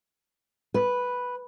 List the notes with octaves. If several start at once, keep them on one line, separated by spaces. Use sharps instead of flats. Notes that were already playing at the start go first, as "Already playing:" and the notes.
B4